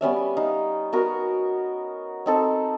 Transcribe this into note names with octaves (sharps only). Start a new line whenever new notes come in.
G3 B3 C#4 E5
D#4 F5
B3 F#4 A#4
C4 D#4 A4